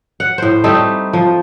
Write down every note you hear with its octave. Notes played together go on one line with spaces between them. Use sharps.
F#5
A2 C5
G3 A3 C4 D#4
F3